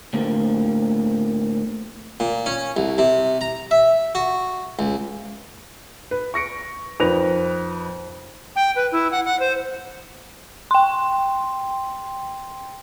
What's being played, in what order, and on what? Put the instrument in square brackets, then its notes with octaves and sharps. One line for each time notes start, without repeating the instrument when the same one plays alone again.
[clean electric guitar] A2 D3 G3 A#3 C4
[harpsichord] A#2
C#4
C2
C3
A#5
E5
F#4
C#2
[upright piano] B4
C#6 A#6 C#7 D7
F2 D#4 A#4 B4 A#6 F7
[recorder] G5
B4
E4
F#5
F#5
C5
[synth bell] G5 C6